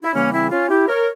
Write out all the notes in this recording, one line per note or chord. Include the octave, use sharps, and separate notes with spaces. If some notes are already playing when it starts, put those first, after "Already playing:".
E4
E2 C#3 E3 G3 A#3 C#4
C4 E4
C#4 F4
E4 G4
A#4 C#5